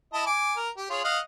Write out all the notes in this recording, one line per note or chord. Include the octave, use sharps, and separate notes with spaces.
E4 D#5 A5
G#5 D6
A#4
G4
F4 G#4 C#5
D#5 F5 F#5